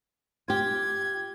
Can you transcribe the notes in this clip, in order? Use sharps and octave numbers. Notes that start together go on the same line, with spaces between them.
F4 G4 G#6